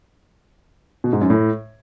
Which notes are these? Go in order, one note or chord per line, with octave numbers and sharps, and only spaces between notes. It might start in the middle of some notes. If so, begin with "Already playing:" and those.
B2
G#2
F#2
A2